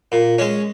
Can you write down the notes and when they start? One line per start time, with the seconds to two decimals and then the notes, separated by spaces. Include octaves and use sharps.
0.12 A#2
0.38 G#3 C#4